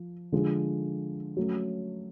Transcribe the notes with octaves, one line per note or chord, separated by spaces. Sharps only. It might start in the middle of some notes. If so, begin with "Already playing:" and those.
Already playing: F3
D3 F3 G#3
F#3 A3 C#4